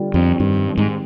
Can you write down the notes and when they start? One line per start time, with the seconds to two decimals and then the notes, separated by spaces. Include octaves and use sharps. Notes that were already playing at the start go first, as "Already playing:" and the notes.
Already playing: D3 G3 F4
0.14 F2 C4
0.40 G2 D#3
0.65 G3
0.78 G#2